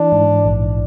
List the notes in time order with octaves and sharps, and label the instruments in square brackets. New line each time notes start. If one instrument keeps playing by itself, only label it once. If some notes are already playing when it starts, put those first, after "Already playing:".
Already playing: [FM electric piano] E3 [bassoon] D4
[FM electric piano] G#2
A#1